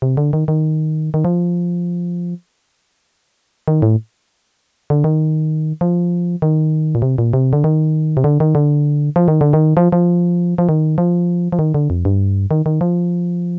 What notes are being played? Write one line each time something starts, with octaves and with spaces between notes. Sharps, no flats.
C3
D3
D#3
D#3
D#3
F3
D#3
A2
D3
D#3
F3
D#3
A#2
C3
A#2
C3
D3
D#3
C3
D3
D#3
D3
F3
D#3
D3
D#3
F3
F3
F3
D#3
F3
F3
D#3
D3
F2
G2
D#3
D#3
F3